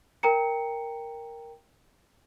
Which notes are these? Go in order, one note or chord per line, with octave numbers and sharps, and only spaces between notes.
A#4 G5 A#5 C#7